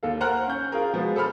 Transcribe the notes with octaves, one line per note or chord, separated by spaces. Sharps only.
D#2 A4 F5
A#4 C5 F#5 A#5 F6 F#6
C#4 G6
F4 G#4 A#4
B2 F3 G#3 B3
A4 C5 B5 F6